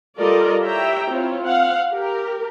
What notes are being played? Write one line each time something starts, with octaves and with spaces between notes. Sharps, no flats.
G3 F4 A4 A#4 D5 D#5
E4 G4 C#5 E5 G5 A#5
C4 E4 F4 C#5
C4 F5 F#5
G4 A#4